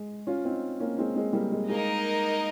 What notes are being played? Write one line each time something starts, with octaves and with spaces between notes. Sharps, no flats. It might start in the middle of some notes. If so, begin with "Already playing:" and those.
Already playing: G#3
C#4 F4
C4 D#4
A#3 C#4
G#3 C4
G#3 C4
G3 A#3
G#3
G#3 A#3 D#4 A#4 D#5